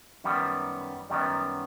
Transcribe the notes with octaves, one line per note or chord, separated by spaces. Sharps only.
F#2 D#3 G3 B3
F#2 D#3 G3 B3